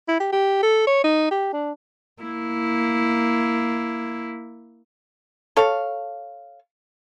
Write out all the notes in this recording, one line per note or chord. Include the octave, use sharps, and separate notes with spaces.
E4
G4
G4
A4
C#5
D#4
G4
D4
A#3 E4
A4 C#5 F5